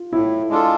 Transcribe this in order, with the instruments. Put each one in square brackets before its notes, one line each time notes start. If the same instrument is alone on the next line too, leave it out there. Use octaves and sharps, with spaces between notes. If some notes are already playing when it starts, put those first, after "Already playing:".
Already playing: [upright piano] F4
[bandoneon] A2 [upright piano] E4
[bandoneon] G#3 D4 F4 A4